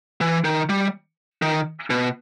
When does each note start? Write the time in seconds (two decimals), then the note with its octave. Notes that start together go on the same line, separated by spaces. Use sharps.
0.21 E3
0.44 D#3
0.69 G3
1.42 D#3
1.90 B2